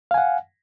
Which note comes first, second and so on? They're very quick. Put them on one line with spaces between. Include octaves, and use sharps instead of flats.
F5 G#5 F#5